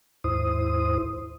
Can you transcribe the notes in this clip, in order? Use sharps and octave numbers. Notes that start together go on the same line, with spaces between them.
D#2 G#2 E4 C5 D#6